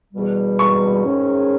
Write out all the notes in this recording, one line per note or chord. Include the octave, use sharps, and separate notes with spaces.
E2 B2 G3
C#6
G#2 D#3 G#3 C#4